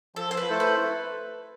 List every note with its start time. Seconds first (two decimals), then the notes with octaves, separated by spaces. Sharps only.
0.16 F3 A4
0.31 C5
0.37 B4
0.49 A3 E4 A4 C5
0.60 B4